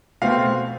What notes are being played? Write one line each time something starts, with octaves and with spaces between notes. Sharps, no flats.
B2 A3 C4 F5